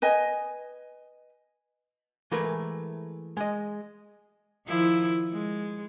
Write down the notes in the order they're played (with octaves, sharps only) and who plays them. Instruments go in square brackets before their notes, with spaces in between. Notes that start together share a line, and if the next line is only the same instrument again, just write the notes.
[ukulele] B4 D#5 G#5
[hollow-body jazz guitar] E3 G#3 A3 A#4 B4
G#3 D#5
[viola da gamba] D#3 F3 E4
G#3